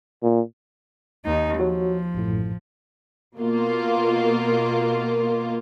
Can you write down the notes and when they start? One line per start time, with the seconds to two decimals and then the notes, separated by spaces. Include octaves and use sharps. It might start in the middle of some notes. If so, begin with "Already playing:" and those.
0.23 A#2
1.25 D#2 D#4
1.60 F3 F#4 C#5
2.14 A1 F#2 A2
3.37 B2 A#3 F4